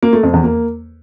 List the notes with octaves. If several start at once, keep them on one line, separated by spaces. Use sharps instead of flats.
A#3
A3
F2
E2
A#3